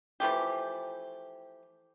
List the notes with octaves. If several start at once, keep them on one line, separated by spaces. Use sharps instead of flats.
E3 F3 A3 G4